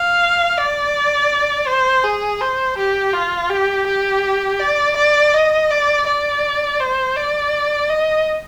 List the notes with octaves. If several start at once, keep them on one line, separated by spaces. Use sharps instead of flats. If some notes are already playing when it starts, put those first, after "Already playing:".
Already playing: F5
D5
C5
G#4
C5
G4
F4
G4
G4
D5
D5
D#5
D5
D5
C5
D5
D#5